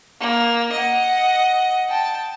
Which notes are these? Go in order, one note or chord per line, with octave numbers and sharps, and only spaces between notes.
A#3
D#5 F#5
G5 A5